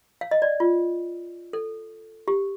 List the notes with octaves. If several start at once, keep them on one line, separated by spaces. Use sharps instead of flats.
F5
D#5
D5
F4
A4
G4